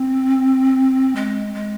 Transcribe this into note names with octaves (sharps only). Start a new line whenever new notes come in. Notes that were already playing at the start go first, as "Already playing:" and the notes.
Already playing: C4
G#3
G#3